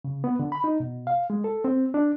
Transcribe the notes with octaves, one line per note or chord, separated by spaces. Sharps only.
C#3
B3
D3
B5
D#4
B2
F5
G#3
A4
C4
D4